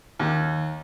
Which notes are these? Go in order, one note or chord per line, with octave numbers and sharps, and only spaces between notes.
D#2